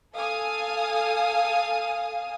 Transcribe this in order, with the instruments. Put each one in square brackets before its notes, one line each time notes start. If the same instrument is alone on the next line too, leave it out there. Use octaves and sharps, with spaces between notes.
[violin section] A4 F5 G#5 D#6